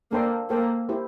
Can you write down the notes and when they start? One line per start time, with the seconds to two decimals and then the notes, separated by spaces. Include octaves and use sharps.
0.12 A#3 D4 A4 C5 G5 C6
0.50 A#3 A4 C5 G5
0.89 E4 G4 C5